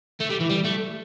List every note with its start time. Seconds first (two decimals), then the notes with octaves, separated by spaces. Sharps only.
0.21 A3
0.30 G3
0.41 E3
0.50 G3
0.65 A3